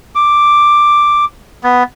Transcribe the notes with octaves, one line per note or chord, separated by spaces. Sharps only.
D6
B3